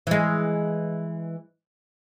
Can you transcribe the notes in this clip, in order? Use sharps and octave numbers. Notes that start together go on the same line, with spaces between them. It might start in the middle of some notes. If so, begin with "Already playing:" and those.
E3 G#3